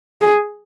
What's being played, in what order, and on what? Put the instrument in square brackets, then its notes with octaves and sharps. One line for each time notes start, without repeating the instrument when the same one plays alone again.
[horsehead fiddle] G#4